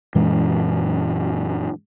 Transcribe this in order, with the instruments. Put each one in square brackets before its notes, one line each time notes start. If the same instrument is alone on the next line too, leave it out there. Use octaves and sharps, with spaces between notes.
[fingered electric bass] F#2 A#2 E3 G#3